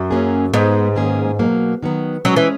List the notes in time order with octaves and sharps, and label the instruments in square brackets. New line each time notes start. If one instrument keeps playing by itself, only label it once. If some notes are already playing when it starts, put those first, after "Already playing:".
Already playing: [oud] F#2
[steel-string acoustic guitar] F#3 A#3 C#4 G#4
[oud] G#2 [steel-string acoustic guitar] G#3 B3 D#4 G#4
[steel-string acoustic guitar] D#3 A#3 C#4 G#4
B2 F#3 A#3
D#3 F#3 B3
[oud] F#3 [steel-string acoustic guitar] G#3 C#4 G#4
[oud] E3